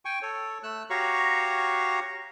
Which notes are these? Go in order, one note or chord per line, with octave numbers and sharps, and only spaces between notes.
G5 G#5 C#6
A4 C#5
A3 E6 F#6
F#4 G4 C#5 F5 A#5 C#6